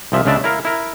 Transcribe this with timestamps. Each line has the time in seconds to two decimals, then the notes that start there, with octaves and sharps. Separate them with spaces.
0.12 C2 F3 E5
0.25 C#2 C#3 D4 D5 E5 A5
0.44 E4 A#4 F5
0.65 E4 A#4